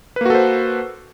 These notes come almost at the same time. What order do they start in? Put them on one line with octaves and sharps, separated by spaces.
B4 A#3 F#4 A4 C5